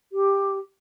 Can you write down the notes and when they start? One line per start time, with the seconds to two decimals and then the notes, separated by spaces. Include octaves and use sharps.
0.13 G4